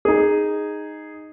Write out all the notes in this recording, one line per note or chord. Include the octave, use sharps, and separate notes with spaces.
D#4 G#4